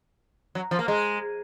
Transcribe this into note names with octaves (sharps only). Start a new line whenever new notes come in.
F#3
F3
A#3
G#3